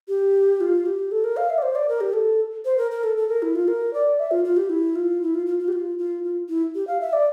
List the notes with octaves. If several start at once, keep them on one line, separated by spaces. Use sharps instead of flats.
G4
F4
G4
A4
A#4
F5
E5
D5
C5
D5
A#4
G4
A4
C5
A#4
A#4
A4
A4
A#4
E4
F4
A#4
D5
E5
F4
F4
G4
E4
F4
E4
F4
F4
F4
G4
F4
F4
F4
E4
G4
F5
E5
D5